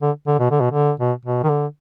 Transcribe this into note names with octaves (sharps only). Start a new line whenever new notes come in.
D3
D3
B2
D3
B2
D3
B2
B2
D#3
D3